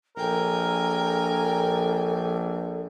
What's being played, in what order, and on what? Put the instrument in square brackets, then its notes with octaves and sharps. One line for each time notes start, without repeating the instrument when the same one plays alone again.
[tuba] A#1 [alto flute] A4 [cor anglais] A#4 [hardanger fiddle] G5 G#5